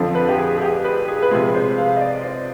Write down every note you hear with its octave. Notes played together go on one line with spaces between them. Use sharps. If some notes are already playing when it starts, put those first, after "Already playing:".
Already playing: F2 D3 F3
B4
G4
G#4
G#4
G4
B4
G#4
B4
C3 F3 G#3 G#4
B4
C5
F5
D#5
D5
C5